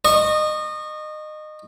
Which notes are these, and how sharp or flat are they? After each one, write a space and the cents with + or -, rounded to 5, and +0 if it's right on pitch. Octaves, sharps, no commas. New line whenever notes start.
D#5 -25 C#6 -15